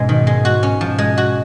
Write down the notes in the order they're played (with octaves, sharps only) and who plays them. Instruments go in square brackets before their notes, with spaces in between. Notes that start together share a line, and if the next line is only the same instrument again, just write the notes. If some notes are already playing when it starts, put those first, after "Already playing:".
Already playing: [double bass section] G#2 B2 [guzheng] G#3 C#4
[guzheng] D#3
G#3
F#4
C#4
[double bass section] G#2 B2 [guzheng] F3
[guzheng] G#3
F#4